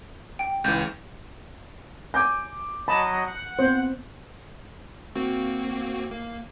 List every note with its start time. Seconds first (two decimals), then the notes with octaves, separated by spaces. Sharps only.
0.39 G5
0.64 C#2 E3 G6
2.14 G#5 D6 G6
2.88 F#3 D#5 A5 B5
3.27 F#5
3.59 B3 C4 C5
5.15 A#3 C4 F#4
6.11 A#3